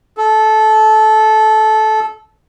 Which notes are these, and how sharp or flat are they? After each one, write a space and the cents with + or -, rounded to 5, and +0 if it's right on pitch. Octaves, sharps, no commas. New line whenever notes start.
A4 -20